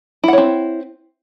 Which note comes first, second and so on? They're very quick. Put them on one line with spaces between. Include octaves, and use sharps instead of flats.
E4 F#5 C#5 C4